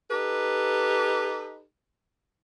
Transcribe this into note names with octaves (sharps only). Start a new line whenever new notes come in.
D#4 G4 A4 B4